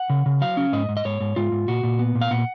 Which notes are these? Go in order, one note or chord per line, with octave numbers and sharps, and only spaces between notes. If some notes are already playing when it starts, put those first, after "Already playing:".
Already playing: F#5
C#3
C#3
F#3 F5
C#4
G#2 D#5
G#2
D#5
G#2 C#5
G#2
G#2 F4
G#2
A#2 F#4
A#2
B3
A#2
F5
A#2 F#5